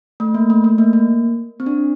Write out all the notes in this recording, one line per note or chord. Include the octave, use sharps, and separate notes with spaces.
A3
A#3
A3
A3
A#3
A#3
C4
D4